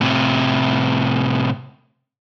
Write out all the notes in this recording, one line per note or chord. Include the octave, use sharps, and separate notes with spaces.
A2 C3